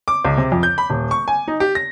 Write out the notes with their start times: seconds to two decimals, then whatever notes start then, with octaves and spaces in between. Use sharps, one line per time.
0.08 D6
0.25 C#2
0.37 C3
0.52 F2
0.63 G6
0.78 B5
0.90 D#1
1.11 C#6
1.28 G#5
1.48 D#4
1.60 G4
1.75 A#6